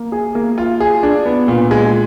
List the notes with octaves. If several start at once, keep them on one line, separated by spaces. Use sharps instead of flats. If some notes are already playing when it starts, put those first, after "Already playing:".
Already playing: A#3
G#4
A#3
F4
G#4
D4
B3
A#2
G#3